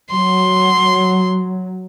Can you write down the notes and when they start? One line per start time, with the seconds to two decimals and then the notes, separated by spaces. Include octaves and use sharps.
0.11 F#3 C6